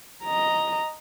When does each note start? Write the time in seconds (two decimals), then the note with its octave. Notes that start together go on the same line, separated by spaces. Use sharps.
0.24 D#5 A#5